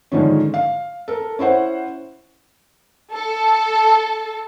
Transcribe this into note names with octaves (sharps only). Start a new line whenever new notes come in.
G#2 D3 D#3 F3 C#4
F5
A4 A#4
C#4 E4 C5 F#5
A4